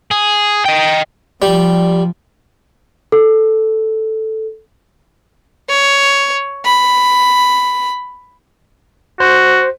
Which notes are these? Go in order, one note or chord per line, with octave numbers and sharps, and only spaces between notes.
G#4
D#5 G5
F3 G3
A4
C#5
B5
F#4 C5